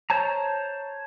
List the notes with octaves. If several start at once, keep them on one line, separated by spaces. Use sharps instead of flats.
C5 C#5 A5 A#5